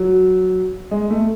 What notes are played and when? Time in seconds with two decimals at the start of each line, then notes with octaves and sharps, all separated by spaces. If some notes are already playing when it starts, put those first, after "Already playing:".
Already playing: F#3
0.91 G#3
1.10 A3